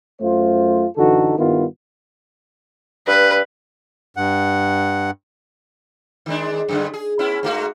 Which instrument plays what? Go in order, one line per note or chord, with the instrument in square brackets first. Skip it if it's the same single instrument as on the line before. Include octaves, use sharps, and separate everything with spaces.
[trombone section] F#2 A3 F4 C5
F#2 D3 E3 D#4 F#4 A4
G2 D#3 G3 B3 E4 F4
[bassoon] G2 [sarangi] B4
[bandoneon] G2 F#5
[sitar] D#3 G#3 D4
F#2 D3 G#3
G#4
B3 C#4 E4
G#2 A3 F#4